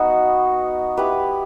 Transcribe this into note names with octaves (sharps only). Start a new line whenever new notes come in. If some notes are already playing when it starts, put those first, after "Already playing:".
Already playing: B3 D#4 F#4
E4 G4 B4